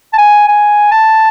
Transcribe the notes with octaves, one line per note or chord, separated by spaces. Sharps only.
A5
G#5
G#5
A5